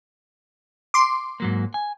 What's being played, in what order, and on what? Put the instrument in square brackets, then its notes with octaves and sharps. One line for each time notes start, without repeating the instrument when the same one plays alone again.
[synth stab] C6 D6
[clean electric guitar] G#2 F#3 A#3
G#5